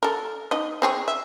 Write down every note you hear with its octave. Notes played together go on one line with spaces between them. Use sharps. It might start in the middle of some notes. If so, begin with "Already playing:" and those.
A4 A#4
D#4 D#5
C4 G#4 C#5
E5